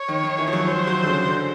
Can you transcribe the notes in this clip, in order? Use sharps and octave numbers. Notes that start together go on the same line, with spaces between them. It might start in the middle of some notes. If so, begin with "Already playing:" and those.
Already playing: C#5
D#3
D#3
E3
F3
F#3
C5
F#3
D3
C#3
D3